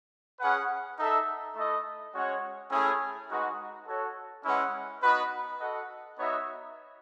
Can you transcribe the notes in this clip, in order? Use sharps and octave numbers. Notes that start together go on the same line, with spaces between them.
C#4 G#4 B4 F#5
D#4 A4 E5
A3 E4 A4 D#5
G#3 C#4 F#4 C#5 F#5
A3 C#4 E4 G#4
G#3 D#4 F#4 B4
F#4 A4 C#5
G#3 C#4 E4 B4 F#5
B3 D#4 F#4 B4
F#4 A4 D#5 F#5
B3 D#4 F#4 C#5 E5